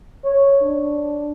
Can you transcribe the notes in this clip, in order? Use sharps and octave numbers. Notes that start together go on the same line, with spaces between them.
C#5
D4